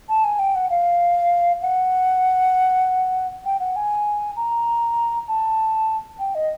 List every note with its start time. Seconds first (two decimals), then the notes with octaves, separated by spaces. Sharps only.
0.09 A5
0.24 G#5
0.39 G5
0.55 F#5
0.70 F5
1.62 F#5
3.46 G5
3.60 F#5
3.76 G#5
4.37 A#5
5.28 A5
6.19 G5
6.35 D#5